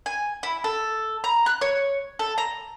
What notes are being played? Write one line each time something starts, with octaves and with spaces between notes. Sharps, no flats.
G#5
E4
A4
A#5
F#6
C#5
A4
A#5